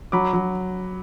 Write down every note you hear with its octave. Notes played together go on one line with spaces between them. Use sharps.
F#3 B5 D6
F#3